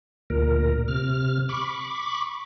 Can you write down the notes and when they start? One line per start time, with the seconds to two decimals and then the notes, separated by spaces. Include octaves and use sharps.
0.30 D2 A#2 A#4
0.88 C3 F6
1.49 B5 C#6 D6